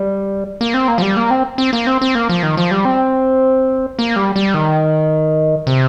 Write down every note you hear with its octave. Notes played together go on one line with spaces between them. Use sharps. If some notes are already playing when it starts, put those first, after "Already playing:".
Already playing: G3
A#3
C4
A#3
F3
G3
A#3
C4
C4
A#3
C4
C4
A#3
F3
D#3
F3
G3
C4
A#3
G3
G3
D#3
C3